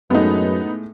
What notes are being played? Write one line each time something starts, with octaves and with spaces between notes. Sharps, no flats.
F#2 A2 G#3 A3 B3 D#4